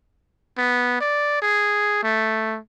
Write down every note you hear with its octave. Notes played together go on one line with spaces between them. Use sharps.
B3
D5
G#4
A3